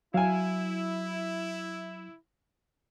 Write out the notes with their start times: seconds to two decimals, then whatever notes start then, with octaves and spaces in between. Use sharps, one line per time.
0.14 F#3 E4 F5 G#5